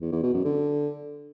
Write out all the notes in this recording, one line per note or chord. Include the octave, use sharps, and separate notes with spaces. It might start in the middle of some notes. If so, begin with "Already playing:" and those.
E2
E2
B2
F#2
D3